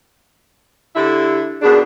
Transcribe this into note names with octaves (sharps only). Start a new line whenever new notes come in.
D3 E4 G4
D#2 B2 D4 G#4